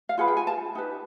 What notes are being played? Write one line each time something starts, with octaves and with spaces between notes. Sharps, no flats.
F5
F4 G#4 B4 F#5
G5
G#5
A5
D#4 G4 B4